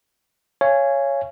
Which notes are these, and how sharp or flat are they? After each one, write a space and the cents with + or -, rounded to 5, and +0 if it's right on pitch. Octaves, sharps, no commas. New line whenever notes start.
C#5 +0 F5 -35 G#5 -5